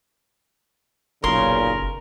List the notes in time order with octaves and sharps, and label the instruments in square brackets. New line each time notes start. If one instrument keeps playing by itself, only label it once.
[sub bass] F#1 [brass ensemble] B1 A#2 C#3 [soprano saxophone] A#4 [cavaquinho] C6